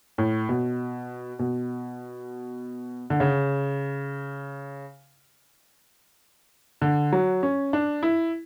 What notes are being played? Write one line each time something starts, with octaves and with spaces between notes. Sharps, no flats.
A2
B2
B2
D3
C#3
D3
F#3
C#4
D4
E4